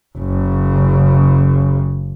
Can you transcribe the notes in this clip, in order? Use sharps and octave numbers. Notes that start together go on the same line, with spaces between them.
F#1 C#3